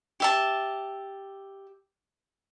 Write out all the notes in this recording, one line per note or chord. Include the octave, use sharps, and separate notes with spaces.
G4 E5 A5